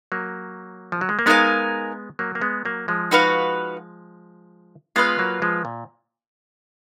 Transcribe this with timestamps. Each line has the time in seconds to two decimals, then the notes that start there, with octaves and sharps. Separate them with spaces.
0.12 F#3 A#3
0.92 F3
1.01 F#3
1.09 G#3
1.19 A#3
1.26 G#3 B3 D#4 A#4 F5 G#5
2.19 F#3 A#3
2.35 A#3
2.41 G#3 B3
2.65 F#3 A#3
2.88 F3 G#3
3.11 D#4 F#4 B4 F5
4.96 G#3 B3 F4 B4 F5
5.19 F#3 A#3
5.42 F3 G#3
5.65 A#2